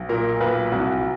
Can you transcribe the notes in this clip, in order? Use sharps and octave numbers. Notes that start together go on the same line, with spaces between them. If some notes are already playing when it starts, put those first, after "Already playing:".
Already playing: B1
A#2 A#4
B1 B4
C2 F#4